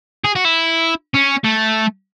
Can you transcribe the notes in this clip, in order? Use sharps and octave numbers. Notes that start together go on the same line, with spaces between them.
G#4
F#4
E4
C#4
A3